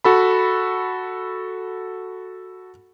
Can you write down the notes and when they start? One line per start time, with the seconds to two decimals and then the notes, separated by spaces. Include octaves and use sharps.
0.04 F#4 A4 B5